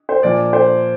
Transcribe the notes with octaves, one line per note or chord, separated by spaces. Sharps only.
C5
A#2 F3 D5
C5